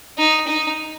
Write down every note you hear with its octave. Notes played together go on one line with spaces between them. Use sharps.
D#4
D#4